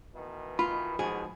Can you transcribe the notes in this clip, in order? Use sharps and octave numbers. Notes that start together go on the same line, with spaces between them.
B2 D#3 E3
F4 B5
D#2 G#2 B2 F3 G#4